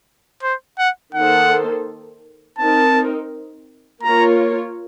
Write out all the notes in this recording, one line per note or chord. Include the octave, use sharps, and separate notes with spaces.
C5
F#5
D#3 A#3 D#4 A4 C5 F#5
C4 D#4 A#4 A5
A#3 F4 A#4 C#5 A#5